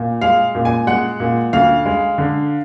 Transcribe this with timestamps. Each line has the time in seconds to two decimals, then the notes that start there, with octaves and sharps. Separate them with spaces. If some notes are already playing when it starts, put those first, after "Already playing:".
Already playing: A#2
0.21 G#3 F5
0.55 A#2
0.65 G#5
0.87 G#3 F#5
1.20 A#2
1.53 D2 F5
1.85 G#3
2.18 D3